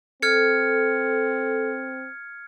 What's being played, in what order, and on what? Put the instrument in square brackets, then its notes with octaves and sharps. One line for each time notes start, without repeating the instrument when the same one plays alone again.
[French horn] C4 [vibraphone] A4 [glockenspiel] F6 G#6 C#7